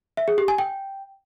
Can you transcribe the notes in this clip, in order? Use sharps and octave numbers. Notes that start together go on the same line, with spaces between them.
E5
G#4
G4
G#5
G5